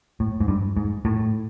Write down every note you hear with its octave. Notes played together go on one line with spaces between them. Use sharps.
A2
G#2
G2
G#2
A2